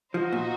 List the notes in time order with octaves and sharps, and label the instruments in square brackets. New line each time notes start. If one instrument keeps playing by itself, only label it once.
[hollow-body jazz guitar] F3 [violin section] D#4 F#4 C5 D#5
[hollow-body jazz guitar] A#2